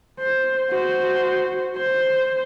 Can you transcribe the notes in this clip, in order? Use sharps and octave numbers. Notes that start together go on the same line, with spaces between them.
C5
F#4 C5
C5